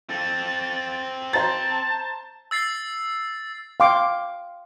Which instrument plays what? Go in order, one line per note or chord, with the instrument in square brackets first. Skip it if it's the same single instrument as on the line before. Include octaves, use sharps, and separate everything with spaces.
[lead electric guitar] C4 A4 [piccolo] A6
[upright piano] C5 A#5 A6 [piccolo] A5
[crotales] E6 A6 C7
[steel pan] F5 G5 C6 D6